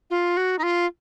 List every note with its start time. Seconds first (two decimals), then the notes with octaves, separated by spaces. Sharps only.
0.10 F4
0.37 F#4
0.58 D#4
0.63 F4